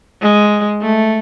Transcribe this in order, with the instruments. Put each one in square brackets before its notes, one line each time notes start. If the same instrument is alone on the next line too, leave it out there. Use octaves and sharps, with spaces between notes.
[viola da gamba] G#3
A3